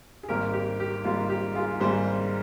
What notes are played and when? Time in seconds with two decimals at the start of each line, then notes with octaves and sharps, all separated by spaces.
0.23 G#4
0.28 G#1 G#2 G3 A#3 G4 A#4
0.53 G4
0.80 G4
1.04 G#1 G#2 G3 A#3 F4
1.29 G4
1.55 F4 G#4
1.80 G#1 G#2 G3 A#3 G#4 C5